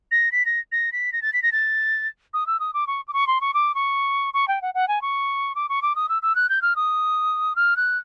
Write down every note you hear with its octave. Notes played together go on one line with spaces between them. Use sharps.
A#6
B6
A#6
A#6
B6
A#6
A6
B6
A#6
A6
D#6
E6
D#6
D6
C#6
D6
C#6
C6
C#6
D6
C#6
C#6
G5
F#5
F#5
G#5
C#6
D6
C#6
D6
D#6
E6
E6
F#6
G6
F6
D#6
F6
F#6